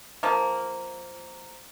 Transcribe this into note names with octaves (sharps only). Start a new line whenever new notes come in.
F3 A#3